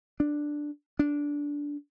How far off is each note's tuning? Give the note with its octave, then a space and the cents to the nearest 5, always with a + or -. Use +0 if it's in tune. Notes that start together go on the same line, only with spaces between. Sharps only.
D4 +5
D4 -15